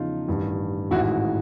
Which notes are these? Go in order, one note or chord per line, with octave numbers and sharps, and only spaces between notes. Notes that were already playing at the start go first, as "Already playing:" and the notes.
Already playing: E2 C#3 F3 D#4 F4
A1 G2 D#3
A1 G#2 D#3 E4 F#4